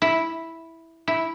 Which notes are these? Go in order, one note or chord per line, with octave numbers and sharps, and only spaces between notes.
E4
E4